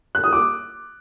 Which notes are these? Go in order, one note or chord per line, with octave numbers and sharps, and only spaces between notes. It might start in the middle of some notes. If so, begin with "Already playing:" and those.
F#6
D#6
D6